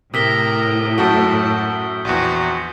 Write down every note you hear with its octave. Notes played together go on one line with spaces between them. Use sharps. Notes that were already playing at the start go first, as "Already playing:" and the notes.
A2 C3 A#4 D#6 B6 G7
F#2 A3 F#4 A5 D#6 G6 G7
A#1 E2 F#4